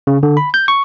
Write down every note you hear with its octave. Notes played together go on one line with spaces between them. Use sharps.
C#3
D3
B5
G6
C#6